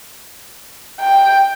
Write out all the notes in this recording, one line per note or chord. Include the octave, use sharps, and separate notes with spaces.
G5